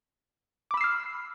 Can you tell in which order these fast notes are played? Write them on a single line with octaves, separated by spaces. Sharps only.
D6 B5 E6 C7 F6